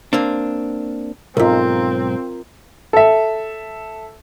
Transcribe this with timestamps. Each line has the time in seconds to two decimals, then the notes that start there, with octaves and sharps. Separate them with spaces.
0.13 A#3 C4 D4
1.37 B1 G#2 C4 F4 A#4
2.93 A4 E5